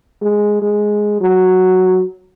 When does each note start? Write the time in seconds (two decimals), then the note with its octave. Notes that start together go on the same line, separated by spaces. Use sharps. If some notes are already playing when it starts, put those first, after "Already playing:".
0.22 G#3
0.62 G#3
1.21 F#3